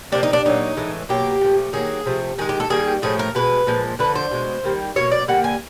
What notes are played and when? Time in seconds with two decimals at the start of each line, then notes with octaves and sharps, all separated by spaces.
0.12 C3 F3 A#3 D4
0.23 D#4
0.33 D4
0.45 A#2 F#3 A#3 D#4
0.77 A2 E3 G#3
1.09 B2 F#3 A#3 G4
1.41 A#2 F3 A3
1.73 D#3 F#3 A#3 G#4
2.06 C3 F3 A3
2.38 D#3 G#3 G#4
2.49 G4
2.60 A4
2.70 D#3 G3 A#3 G#4
3.02 A2 F3 A3 G#4
3.19 A#4
3.35 B2 G#3 B4
3.66 A#2 F3 G#3
3.99 D3 F3 A3 B4
4.15 C5
4.31 B2 G#3
4.64 D#3 G3 A#3
4.96 B2 F#3 A#3 C#5
5.12 D5
5.28 D3 G3 A#3 F#5
5.44 G#5